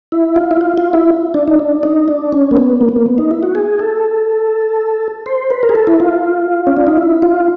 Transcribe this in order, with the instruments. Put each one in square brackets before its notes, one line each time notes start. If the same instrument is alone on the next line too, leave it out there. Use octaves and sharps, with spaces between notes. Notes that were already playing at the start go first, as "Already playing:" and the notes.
[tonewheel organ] E4
F4
E4
F4
F4
E4
D4
D#4
D4
D#4
D4
C#4
A#3
B3
A#3
B3
A#3
B3
D#4
E4
F#4
G#4
A4
C5
B4
A#4
G#4
A4
E4
F4
C#4
D4
D#4
E4
F4